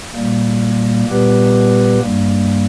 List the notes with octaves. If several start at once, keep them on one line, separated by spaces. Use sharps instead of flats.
A#2 G3 A#3
A#2 G3 B3 G4 B4
G2 G3 A#3